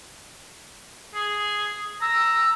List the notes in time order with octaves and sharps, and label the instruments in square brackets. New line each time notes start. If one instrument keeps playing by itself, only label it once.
[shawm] G#4
[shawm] A#5 [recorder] E6